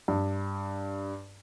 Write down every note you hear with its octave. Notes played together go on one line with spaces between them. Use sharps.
G2